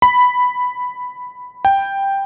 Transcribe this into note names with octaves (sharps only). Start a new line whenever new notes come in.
B5
G5